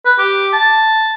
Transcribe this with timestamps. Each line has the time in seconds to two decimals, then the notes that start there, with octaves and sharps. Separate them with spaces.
0.06 B4
0.18 G4
0.53 A5